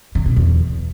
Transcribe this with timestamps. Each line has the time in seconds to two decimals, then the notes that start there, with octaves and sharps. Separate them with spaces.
0.15 C#3
0.26 B2
0.36 E2